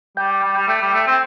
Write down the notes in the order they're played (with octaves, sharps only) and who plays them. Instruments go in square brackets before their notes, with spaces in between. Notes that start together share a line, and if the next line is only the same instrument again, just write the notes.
[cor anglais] G3 [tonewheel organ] G5
[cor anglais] G3
G3
A3
G3
A3
C4